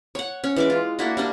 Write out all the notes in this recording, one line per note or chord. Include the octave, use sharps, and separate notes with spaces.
C#5 F#5
C#4
E3 G#3 D6
F4
A#3 D4 E4 F#4
G3 A#3 D4